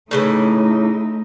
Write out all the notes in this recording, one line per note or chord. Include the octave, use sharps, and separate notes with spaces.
A2 C#3 E3 A3 D#4